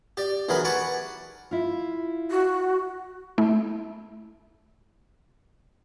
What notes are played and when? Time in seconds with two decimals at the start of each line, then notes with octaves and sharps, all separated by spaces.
0.17 G4 D5
0.49 B1 E3 F#3 G#4 A#4 B5
0.65 F#5 G#5 A5 B5 C#6 D6
1.51 E4 F4
2.31 F#4
3.38 A3 E4